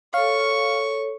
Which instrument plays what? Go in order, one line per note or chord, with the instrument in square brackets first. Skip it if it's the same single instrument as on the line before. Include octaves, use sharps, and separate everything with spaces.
[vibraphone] A4 C#5 [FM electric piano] F5 [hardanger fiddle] C#6